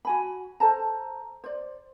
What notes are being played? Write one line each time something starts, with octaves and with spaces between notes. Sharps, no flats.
F#4 G#5 B5
A4 C5 A5 A#5
C5 D5